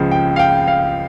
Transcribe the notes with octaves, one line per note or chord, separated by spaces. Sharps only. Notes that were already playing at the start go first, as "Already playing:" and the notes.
Already playing: C#2 C#3 F3
G5
F5
G5
F5